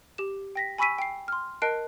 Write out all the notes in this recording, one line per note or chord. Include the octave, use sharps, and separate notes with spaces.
G4 E7
G5 A#6 B6
G#5 B5 C#6 E6 B6 D#7
G5 C7
C6 F6
A#4 D#5 A5 F#6 C7 D7